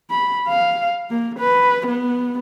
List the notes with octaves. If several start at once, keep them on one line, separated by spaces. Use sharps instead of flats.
B5
F5
A#3
B4
B3